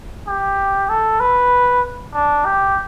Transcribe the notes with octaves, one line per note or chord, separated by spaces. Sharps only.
G4
A4
B4
D4
G4